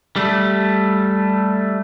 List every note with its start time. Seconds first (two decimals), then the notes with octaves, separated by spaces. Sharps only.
0.16 G3 A3